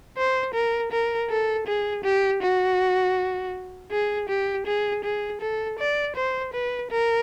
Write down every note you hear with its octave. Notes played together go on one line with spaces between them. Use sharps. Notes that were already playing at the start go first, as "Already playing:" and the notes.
C5
A#4
A#4
A4
G#4
G4
F#4
G#4
G4
G#4
G#4
A4
D5
C5
B4
A#4